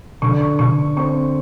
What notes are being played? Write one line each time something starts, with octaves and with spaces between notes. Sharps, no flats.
D3 C#6
C#6
D3 C#6
C4 C#6